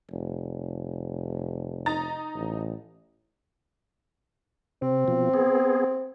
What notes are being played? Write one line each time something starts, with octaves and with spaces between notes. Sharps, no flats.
F1
D#4 A#5 A6
A1
C3 C4
B2 F3
B3 G#4